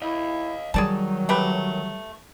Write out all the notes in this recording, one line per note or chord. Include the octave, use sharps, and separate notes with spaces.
E4 D#5 F5
D#3 F#3 G3 G#4 D5 A5
A3 G4 B4